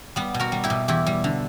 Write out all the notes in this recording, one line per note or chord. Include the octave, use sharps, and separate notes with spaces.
G3 B3
B2
F#4 A#4
G3
E4 G4
B2
E2 E4 G4
G3
D3